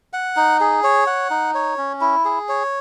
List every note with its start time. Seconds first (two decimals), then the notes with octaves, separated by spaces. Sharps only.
0.13 F#5
0.36 D#4
0.60 G#4
0.84 C#5
1.07 F#5
1.30 D#4
1.55 C#5
1.78 C#4
2.01 E4
2.25 G#4
2.49 C#5